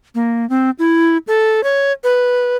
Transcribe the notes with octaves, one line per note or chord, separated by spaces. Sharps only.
A#3
C4
E4
A4
C#5
B4